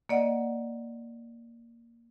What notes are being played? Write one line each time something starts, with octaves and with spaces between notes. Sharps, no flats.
A#3 D5 D#5 F#5